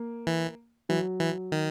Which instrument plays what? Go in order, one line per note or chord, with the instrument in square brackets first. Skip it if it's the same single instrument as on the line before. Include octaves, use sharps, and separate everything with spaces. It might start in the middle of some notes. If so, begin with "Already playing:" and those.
Already playing: [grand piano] A#3
[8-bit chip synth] E3
[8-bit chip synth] E3 [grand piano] F#3
[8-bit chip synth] E3
D#3